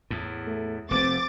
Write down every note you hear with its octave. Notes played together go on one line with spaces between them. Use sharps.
E2 A2
A3
F1 A3 C4 D6 A6